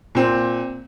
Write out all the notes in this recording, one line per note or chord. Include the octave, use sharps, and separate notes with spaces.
A#2 C4